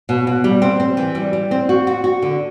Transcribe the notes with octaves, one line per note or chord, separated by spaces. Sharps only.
B2
B2
G3
C4
C4
E3
G3
G3
C4
F#4
F#4
F#4
D3